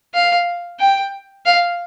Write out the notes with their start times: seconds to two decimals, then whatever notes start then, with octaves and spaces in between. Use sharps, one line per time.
0.14 F5
0.80 G5
1.46 F5